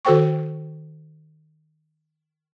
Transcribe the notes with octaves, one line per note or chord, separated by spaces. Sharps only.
D#3 F#4 A4 C5 G5 C#6